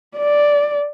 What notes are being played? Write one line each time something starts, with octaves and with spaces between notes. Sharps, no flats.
D5